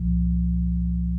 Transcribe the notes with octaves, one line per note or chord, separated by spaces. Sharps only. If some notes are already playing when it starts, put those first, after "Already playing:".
Already playing: C2 A#2 F3